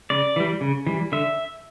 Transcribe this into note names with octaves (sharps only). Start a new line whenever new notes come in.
C#3 D5
E3 G3
C#3
E3 G3
D3 E5